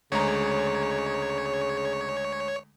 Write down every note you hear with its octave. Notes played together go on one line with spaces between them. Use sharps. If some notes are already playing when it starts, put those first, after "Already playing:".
D2 C#3 G#3 C#5 A#5